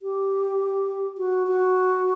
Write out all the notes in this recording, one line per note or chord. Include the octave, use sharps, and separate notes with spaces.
G4
F#4
F#4